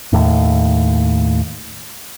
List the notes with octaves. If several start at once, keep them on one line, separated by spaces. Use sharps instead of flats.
D#2 A2